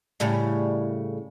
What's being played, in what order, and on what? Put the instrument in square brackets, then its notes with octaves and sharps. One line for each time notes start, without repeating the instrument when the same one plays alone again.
[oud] A2 C#3 G3